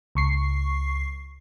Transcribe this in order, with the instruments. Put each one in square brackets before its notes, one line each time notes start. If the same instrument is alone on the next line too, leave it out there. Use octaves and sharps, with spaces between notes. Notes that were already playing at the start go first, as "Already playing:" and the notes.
[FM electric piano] C#2 C#6 C7